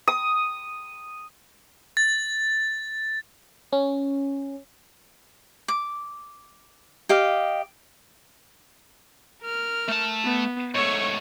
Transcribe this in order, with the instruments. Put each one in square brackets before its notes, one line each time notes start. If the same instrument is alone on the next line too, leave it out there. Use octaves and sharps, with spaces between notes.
[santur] D#6
[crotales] A6
[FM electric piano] C#4
[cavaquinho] D6
G4 D#5 F5
[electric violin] A#4 F6
[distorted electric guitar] A3 A5
[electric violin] B3
[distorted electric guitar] G#2 A3 [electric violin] C#5 C#6